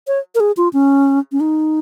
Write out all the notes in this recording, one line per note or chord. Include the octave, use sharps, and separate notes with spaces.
C#5
A#4
G#4
F4
C#4
C#4
D#4